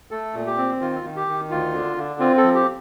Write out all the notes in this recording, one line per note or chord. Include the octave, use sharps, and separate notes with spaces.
A3 A4
A#2
G4
C4
D#3 F4
D#3
G4
D#3
D2 F4
D3
D3
C4 F4
A4
F3
G4